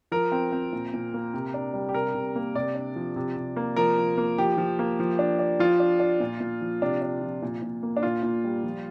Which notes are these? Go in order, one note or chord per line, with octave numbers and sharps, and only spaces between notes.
F3 A#4
C4
C4
A#2
A#2
A#3
C3
D4
G3
G4
C3 A#4
C3
A#3
C3 D5
D4
F3
C3
C3
A#3
F3 A#4
F3
A#3
F3 G4
F3
A#3
F3
D4
D4
F3 F4
D4
D4
A#2
A#2
F3
C3 D4
D4
F3
A#2
A#2
A#3
D4
A#2 F4
A#2
G3
F3